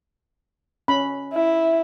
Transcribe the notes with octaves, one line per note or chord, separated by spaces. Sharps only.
C#4 B5
E4